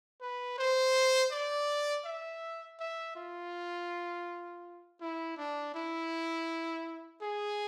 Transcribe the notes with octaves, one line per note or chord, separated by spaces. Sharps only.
B4
C5
D5
E5
E5
F4
E4
D4
E4
G#4